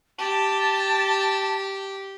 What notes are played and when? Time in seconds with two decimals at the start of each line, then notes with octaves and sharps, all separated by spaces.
0.19 G4 A5